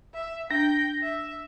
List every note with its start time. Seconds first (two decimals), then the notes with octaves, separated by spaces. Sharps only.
0.14 E5
0.51 D4 G5 A#6
1.03 E5